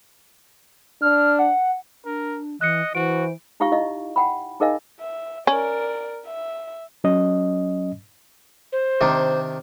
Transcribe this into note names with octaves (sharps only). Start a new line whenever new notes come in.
D4 F6
F#5
D4 A#4
E3 D#5 F#6 C#7
E3 F#4 C5 D7
D#4 F4 G4 F5 C#6
E4 D#5 F5
F#5 G5 B5
D#4 G#4 A#4 D#5 F5 G#5
E5
C#4 A#4 D5
E5
F#3 C#4 D#5
C5
C3 D#3 D4